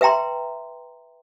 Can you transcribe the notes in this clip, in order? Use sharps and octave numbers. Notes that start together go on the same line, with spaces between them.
B4 E5 G5 A#5 C6